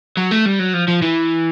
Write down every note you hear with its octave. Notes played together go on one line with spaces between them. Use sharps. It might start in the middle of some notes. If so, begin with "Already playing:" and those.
F#3
A3
G3
F#3
F3
F3
E3